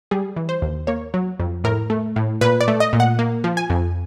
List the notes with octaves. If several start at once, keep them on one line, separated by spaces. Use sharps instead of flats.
G3 G#4
E3
C5
D#2
A#3 C#5
F#3
F2
A2 A#4
A3
A2
A#2 B4
D5
A3
D#5
A#2
F#5
A#3
F3
G#5
F2